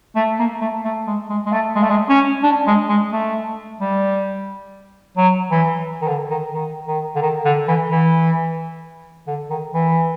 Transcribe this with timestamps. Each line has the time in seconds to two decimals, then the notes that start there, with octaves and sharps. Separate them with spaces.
0.16 A3
0.39 A#3
0.61 A3
0.84 A3
1.07 G#3
1.29 G#3
1.46 G#3
1.53 A3
1.75 G#3
1.83 A3
1.90 G#3
2.09 C#4
2.43 D4
2.67 G#3
2.89 G#3
3.12 A3
3.81 G3
5.17 F#3
5.51 E3
6.02 D#3
6.08 D3
6.30 D#3
6.54 D#3
6.88 D#3
7.16 D3
7.22 D#3
7.45 D3
7.68 E3
7.90 E3
9.27 D3
9.50 D#3
9.73 E3